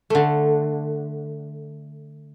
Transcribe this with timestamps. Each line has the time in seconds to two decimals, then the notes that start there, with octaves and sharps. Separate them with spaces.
0.10 D3 A3